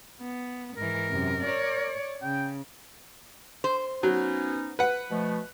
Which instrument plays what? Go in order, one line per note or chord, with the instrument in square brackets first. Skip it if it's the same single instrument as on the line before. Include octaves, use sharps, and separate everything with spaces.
[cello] B3
[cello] G#2 E3 [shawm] A#4
[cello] F#2 C3
C#5 D5
[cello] C#3 [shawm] G5
[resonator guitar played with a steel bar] C5
[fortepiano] F#3 [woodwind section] B3 C#4 D#4
[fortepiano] B4 F#5
[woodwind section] B2 F3 A3